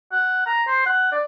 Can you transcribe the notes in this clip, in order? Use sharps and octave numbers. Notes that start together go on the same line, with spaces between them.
F#5
A#5
C5
F#5
D5